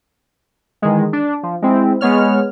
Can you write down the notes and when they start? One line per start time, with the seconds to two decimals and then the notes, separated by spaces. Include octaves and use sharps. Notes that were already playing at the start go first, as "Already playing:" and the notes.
0.82 D#3 E3 G#3
1.13 D4
1.43 F3
1.62 G#3 C4 E4
2.01 G#3 B3 C#5 F6